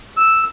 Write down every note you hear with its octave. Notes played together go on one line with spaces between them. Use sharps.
E6